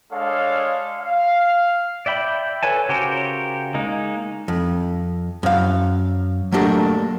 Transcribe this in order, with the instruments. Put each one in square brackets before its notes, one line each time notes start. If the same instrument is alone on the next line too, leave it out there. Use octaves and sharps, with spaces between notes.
[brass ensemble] G#3 D4 A4 C#5 F5
F5
[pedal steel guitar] D5 E5 G5 B5
A4 B4 C#5 G#5 A5
C#3 F#4 G4 A#4 C5
G#3 A#3 D#4
[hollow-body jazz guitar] F2
F#2 F5
F#3 A3 A#3 D4 G4 A#4